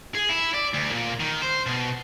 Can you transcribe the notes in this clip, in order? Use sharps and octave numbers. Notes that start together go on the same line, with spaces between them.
G#4
E4
D5
D2
A#2
D#3
C5
B2